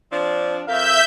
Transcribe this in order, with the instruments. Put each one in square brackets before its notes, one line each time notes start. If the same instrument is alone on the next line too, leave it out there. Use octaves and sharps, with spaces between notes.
[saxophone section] F3 C4 D4
[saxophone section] F2 A#4 F5 [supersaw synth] E5 G6